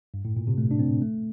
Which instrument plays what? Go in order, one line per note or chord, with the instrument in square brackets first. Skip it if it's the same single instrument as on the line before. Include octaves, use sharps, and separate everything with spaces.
[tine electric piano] G2
A2
A#2
C3
A3
D4
C4
A3